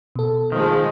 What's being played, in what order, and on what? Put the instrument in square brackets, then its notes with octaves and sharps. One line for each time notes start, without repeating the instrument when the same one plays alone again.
[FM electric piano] B2 A4
[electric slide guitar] D#3 [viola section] F3 G#3